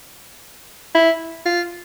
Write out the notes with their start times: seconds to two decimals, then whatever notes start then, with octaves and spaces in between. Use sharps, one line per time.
0.95 E4
1.46 F4